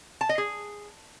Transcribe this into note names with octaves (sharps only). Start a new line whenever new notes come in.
A5
D#5
G#4